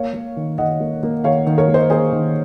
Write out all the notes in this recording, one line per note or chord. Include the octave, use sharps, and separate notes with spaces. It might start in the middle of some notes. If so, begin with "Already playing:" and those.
Already playing: A#3 C#5 F5
A#3
D#3
D#3 D#5 F#5
A#3
A#3
D#3 C#5 F5
D#3
A#4 C#5
A#3
C5 D#5
A#3 G#4 C5
D#3